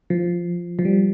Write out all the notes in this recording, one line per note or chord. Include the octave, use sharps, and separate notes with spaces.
F3
F3
G3